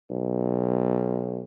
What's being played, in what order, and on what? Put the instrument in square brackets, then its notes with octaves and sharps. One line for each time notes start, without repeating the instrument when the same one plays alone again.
[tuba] B1